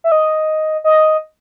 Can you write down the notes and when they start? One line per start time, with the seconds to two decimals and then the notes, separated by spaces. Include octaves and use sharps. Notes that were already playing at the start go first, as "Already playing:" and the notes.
0.04 E5
0.12 D#5
0.84 D#5